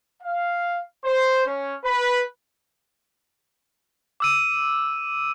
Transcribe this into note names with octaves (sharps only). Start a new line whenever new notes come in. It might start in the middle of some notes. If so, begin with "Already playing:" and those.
F5
C5
C#4
B4
D6 E6 D#7